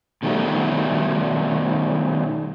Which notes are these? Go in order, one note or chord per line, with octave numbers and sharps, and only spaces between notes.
B2 D#3 G3 A3 F#4